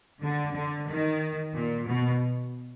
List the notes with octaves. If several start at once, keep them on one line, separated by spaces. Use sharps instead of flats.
D3
D3
D#3
A#2
B2